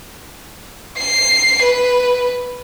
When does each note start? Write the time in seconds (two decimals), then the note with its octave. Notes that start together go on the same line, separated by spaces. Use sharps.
0.98 C7
1.63 B4